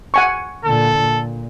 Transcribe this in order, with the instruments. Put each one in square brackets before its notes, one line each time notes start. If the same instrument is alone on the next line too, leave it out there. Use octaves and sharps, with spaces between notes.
[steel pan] F#5 G#5 C#6
[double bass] A#2 D3 [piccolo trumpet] A4
[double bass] A#2